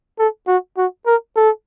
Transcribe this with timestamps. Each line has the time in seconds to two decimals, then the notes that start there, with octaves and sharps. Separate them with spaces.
0.19 A4
0.48 F#4
0.78 F#4
1.06 A#4
1.36 A4